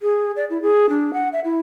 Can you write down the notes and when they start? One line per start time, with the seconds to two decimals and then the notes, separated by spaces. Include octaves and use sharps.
0.02 G#4
0.36 D5
0.50 E4
0.62 G#4
0.89 D4
1.13 F#5
1.33 E5
1.45 E4